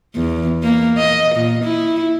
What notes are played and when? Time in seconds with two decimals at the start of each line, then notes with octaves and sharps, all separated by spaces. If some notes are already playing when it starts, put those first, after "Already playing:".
0.16 E2
0.63 A#3
0.98 D#5
1.35 A#2
1.64 E4